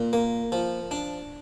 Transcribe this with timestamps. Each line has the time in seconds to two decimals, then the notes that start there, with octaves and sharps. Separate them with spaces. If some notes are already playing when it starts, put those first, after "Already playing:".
Already playing: A#2
0.13 A#3
0.52 F3
0.91 D4